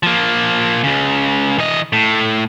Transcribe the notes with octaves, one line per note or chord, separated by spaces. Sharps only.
F3 A#3
C#2 C#3
E3 D#5
A2